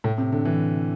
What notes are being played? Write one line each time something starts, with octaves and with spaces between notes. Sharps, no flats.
A2
C3
D3
E3